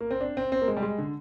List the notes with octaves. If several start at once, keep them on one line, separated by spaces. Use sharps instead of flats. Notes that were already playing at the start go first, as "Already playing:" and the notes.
A#3
C4
D4
C4
C4
A#3
G#3
G3
G#3
D3